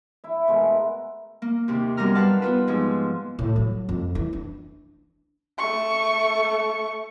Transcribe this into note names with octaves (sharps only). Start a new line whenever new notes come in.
E4 E5
B2 G#3 A3 A#4
A#3
D#2 C3
F#2 G3 B3 A#4 A#5 F6
B4 C5 F5 F#5 A5
B3 F4 B4
G#2 F3 G#4
A2
F#3
F2
E3
D4
A3 C#6